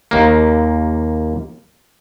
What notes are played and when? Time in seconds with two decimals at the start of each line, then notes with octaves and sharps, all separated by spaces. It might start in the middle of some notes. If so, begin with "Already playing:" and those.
0.11 D#2 A#3